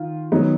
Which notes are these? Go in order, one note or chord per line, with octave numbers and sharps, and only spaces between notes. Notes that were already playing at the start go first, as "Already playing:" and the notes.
Already playing: D#3 F4
D#3 F#3 B3 D#4